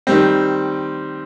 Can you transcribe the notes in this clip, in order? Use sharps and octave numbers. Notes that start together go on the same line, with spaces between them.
D#3 G3 C4